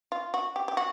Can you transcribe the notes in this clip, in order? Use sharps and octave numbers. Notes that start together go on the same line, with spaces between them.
F4
F#4
G4
G4
F#4